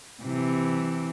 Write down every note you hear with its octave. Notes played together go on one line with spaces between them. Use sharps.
C3 E3